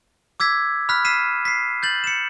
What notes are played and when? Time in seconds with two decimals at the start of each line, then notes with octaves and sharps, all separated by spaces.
0.40 D6 E6 G#6 B6
0.89 B5 F6 F#6 B6
1.05 F6 B6 C7 D#7 E7
1.45 B6 C7
1.83 G6 A6 F#7
2.04 C#7 E7